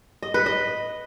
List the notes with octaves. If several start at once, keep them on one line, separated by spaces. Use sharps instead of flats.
D#5
B4
D#5